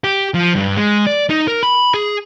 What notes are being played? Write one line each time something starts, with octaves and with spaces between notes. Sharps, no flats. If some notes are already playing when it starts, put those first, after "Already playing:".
G4
F3
G2
G#3
D5
D#4
A#4
B5
G#4